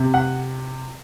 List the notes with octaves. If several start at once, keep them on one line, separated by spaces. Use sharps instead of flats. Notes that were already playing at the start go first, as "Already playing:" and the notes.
Already playing: C3
F#5